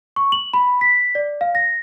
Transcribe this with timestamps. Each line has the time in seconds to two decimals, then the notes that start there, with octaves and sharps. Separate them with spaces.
0.16 C#6
0.32 F#7
0.54 B5
0.81 B6
1.15 D5
1.41 F5
1.55 A#6